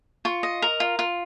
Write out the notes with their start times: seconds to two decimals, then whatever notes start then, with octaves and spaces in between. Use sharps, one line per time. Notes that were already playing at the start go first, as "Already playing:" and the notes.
0.25 F4 C#6
0.43 D#5
0.62 A#4
0.80 F4
0.99 F4